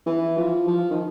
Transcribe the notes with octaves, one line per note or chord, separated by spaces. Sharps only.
E3
F3
F3
D#3